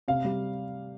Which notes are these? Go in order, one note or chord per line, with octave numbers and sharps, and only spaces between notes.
C3 F5
G3